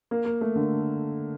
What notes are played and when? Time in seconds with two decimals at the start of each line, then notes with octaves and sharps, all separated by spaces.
0.11 A#3
0.25 A#3
0.41 A3
0.56 D3